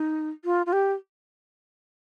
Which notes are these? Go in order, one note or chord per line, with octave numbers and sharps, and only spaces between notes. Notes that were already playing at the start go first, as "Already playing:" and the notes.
Already playing: D#4
F4
F4
G4